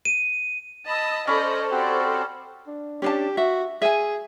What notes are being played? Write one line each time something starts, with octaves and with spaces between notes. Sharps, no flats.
D#7
D#5 A5 B5 D#6 E6
C#4 A4 C5 D5 D#5 B5
C4 F#4 G4 D5
D4
C#4 D4 G4 A5
F#4 E5
G#4 E5 G#5